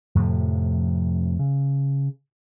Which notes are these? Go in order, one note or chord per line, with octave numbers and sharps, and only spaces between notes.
F2 A2 C3 F3
C#3